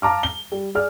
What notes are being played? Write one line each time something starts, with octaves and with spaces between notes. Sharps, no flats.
F5 A5 A#5 D6 F6
G7
G3
G#4 D5 F6